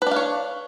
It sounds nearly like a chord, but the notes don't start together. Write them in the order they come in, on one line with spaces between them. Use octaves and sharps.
B4 D4 F5 C#5